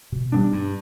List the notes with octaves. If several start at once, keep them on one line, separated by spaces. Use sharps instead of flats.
B2
G3 B3 D4
G2